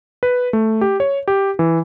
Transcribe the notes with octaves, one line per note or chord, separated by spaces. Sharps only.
B4
A3
G4
C#5
G4
E3